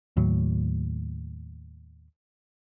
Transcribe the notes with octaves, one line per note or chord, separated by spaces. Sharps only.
D#2 A2 F#3